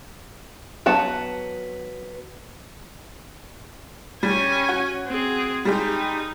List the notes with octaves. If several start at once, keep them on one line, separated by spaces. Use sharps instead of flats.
F#3 B3 A5
G3 C#4 G4 G#5
F#4
C4 G#4
G3 G#3 D#4 G4